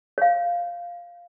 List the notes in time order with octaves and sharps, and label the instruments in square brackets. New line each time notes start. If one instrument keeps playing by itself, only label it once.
[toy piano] C#5 F5